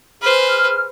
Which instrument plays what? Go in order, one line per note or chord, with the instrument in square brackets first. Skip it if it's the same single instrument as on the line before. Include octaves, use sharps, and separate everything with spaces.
[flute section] G#4 F6 [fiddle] B4 C5